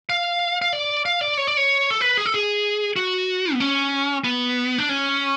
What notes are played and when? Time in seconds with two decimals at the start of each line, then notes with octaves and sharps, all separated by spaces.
0.09 F5
0.62 F5
0.73 D5
1.05 F5
1.21 D5
1.37 C#5
1.47 D5
1.57 C#5
1.90 A4
2.01 B4
2.17 G#4
2.26 A4
2.34 G#4
2.96 F#4
3.53 B3
3.60 C#4
4.24 B3
4.79 D4
4.89 C#4